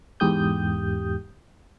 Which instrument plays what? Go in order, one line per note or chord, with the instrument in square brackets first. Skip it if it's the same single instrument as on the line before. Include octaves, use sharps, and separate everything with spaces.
[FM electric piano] E2 G#2 G4 D#6 G6